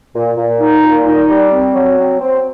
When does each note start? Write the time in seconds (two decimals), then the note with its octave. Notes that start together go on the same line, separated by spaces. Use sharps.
0.14 A#2
0.36 A#2
0.60 D#4
0.83 A#2
1.06 D#4
1.29 G3
1.52 C4
1.75 F#3
1.98 C4
2.20 C4